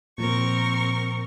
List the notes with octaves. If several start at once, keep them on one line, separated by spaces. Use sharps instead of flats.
A#2 F3 C4 A#4 C#6